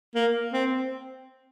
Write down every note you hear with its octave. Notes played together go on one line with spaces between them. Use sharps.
A#3
C4